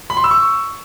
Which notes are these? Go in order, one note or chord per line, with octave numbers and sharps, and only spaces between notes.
B5
C6
E6
C#6